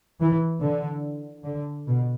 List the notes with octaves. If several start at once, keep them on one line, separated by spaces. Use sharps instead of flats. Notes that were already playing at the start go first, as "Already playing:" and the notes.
E3
D3
D3
B2